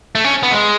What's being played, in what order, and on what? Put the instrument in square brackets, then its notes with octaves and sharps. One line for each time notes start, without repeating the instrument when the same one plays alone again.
[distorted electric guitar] A3
C#4
B3
G#3